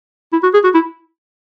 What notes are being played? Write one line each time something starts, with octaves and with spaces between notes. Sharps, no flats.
E4
F#4
G#4
F#4
E4